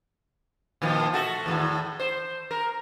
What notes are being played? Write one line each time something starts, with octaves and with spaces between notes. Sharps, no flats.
A#2 D#3 F3
A3 F#4 A4
E2 A2 D#3
C5
A#4